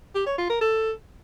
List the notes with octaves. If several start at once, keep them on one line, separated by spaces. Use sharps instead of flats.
G4
C#5
F4
A#4
A4